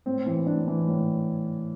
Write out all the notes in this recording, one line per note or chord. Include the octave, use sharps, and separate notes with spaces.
A2 C4
E3
A2 D4
E3
A2